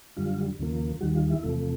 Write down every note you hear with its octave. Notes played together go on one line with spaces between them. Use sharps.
F#2 D3 G3 F4
D#2 C#3 F3 A#3
D#2 D#3 G3 F#4
F4
E4
E2 C3 F3 A3